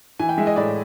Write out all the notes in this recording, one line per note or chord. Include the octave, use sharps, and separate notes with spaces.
E3 G#5
G5
G#3 E5
D#5
A2 D5